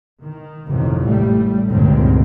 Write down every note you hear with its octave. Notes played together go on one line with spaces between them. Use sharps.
D#3
A1 F2 C3 D#3
A2 G3 A3
C#2 G2 A#2 D3 D#3 C4